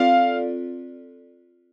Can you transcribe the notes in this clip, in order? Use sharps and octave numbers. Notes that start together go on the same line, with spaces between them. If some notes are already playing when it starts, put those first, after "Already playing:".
Already playing: C4 F4 A4 D5 F5